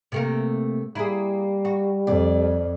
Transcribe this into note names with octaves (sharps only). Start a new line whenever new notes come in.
C3 A3 A#3
G3 A#3 E4 G#4
F#4
F2 D5